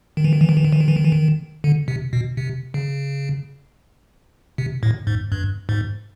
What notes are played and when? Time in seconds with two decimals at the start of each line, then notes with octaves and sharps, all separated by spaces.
0.17 D#3
0.24 E3
0.33 D#3
0.41 E3
0.49 D#3
0.57 E3
0.65 D#3
0.73 E3
0.80 D#3
0.88 E3
0.96 D#3
1.05 E3
1.12 D#3
1.64 D3
1.88 C3
2.13 B2
2.37 C3
2.74 C#3
4.58 C3
4.83 A2
5.07 G#2
5.32 G2
5.69 G#2